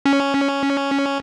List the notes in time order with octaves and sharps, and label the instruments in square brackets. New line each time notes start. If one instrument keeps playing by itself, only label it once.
[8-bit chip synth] C#4